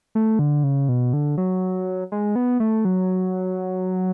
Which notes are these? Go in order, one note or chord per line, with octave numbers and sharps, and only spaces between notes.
A3
D3
C#3
B2
D3
F#3
G#3
B3
A3
F#3